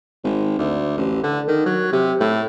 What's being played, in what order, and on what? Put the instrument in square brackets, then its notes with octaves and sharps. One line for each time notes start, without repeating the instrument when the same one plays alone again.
[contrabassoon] G#1
D2
A1
D3
D#3
F#3
C3
A2